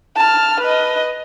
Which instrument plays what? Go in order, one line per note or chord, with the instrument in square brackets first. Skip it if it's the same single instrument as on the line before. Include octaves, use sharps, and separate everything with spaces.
[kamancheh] A5 F6
B4 D#5